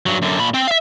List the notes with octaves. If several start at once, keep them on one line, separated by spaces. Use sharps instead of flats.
G2 F#3
F#2 D3
A#2 B5
C4 G5
E5 F5